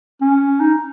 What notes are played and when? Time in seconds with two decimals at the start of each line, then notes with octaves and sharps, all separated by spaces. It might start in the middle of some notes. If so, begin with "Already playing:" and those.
0.21 C#4
0.60 D#4